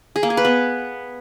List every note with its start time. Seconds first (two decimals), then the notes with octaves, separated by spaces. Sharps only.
0.16 G#4
0.23 A#3
0.30 G#4
0.37 B4
0.45 B3